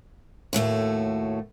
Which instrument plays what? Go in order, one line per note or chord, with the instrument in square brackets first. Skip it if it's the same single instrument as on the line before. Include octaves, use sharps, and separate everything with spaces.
[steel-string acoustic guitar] D#2 A2 A3 F#4